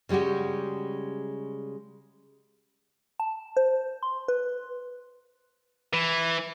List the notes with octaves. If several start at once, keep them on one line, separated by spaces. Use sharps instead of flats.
C#3 G3 G#3 F#4 G4
A5
C5
C6
B4
E3